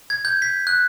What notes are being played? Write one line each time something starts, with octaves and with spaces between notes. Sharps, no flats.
G#6
G6
B6
F#6